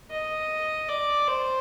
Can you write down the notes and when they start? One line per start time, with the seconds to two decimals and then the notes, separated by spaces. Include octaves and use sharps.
0.11 D#5
0.89 D5
1.27 C5